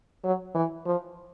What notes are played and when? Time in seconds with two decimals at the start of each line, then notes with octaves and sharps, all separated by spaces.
0.24 F#3
0.55 E3
0.86 F3